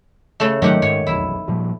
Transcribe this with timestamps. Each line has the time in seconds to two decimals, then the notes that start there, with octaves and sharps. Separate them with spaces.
0.40 C#3 A3
0.62 G#2 D#3 F#3 A3 G4 F#5
0.82 G#2 C#5
1.07 F1 B1 E2 E4
1.48 A#2 F3 G3